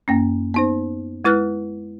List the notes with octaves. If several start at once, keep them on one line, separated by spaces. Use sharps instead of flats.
F#2 A#3 C#4
B3 D#4 C5
G#3 E4 B4 F6 F#6